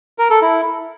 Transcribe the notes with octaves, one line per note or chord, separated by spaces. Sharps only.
A#4
A4
E4